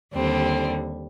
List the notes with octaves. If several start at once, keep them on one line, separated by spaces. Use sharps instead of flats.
D#2 D3 G3 C4